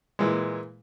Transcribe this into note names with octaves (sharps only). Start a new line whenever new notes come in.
A#2 E3 G#3